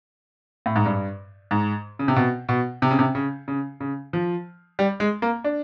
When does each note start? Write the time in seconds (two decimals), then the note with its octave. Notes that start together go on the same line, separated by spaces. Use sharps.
0.66 A2
0.76 G#2
0.86 G2
1.51 G#2
1.99 C#3
2.08 C3
2.16 B2
2.49 B2
2.82 C3
2.91 C#3
2.99 C3
3.15 C#3
3.48 C#3
3.80 C#3
4.13 F3
4.79 G3
5.00 G#3
5.22 A#3
5.44 D4